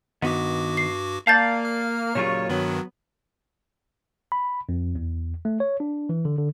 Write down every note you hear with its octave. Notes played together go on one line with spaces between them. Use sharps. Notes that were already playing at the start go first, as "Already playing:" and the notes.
G2 D#3 B3 F#4 F#5 D6
C7
A#3 D5 F5 A5 G6 A6
F6
D#2 A#2 C#3 F#3 F4 C#5
G2 D#3 F#3 B3
B5
F2
E2
A3
C#5
D4
E3
D3
D3